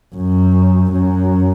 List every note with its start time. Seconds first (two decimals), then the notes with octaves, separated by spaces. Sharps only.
0.15 F#2
0.92 F#2